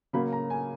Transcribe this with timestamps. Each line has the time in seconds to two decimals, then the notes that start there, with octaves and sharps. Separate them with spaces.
0.13 C#3 F#3 A#3 B5
0.32 A#5
0.50 G#5